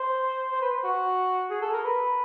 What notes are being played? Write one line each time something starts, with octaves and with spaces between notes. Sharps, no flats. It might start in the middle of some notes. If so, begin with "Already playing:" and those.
Already playing: C5
C5
B4
F#4
G#4
A4
A#4
B4